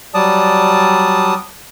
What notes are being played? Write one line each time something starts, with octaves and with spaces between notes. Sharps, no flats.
F#3 G3 D5 A5 D#6